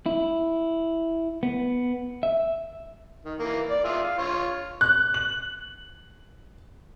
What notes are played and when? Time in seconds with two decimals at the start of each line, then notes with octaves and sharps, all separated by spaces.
0.06 E4
1.43 B3
2.23 E5
3.25 D#3
3.40 E3 A#3
3.70 D5
3.84 F4 G#4 E5
4.03 F5
4.18 F4 C#5
4.81 F#6
5.14 F#7